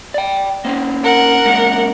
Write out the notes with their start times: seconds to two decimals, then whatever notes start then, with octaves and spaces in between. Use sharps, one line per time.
0.14 D5 G5
0.65 A#3 C4 C#4
1.04 A#4 F#5
1.45 G#3 A#3 C#4